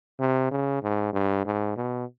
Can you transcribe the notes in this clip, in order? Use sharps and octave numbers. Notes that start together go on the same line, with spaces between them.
C3
C#3
G#2
G2
G#2
B2